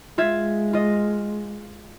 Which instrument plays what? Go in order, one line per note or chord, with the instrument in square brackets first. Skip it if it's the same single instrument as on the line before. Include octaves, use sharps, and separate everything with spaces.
[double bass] G#3 [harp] F4 E5 G#6
[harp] F4 D#5